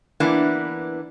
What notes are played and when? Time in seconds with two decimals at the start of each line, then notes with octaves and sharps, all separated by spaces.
0.20 E3 A#3 B3 D4 E4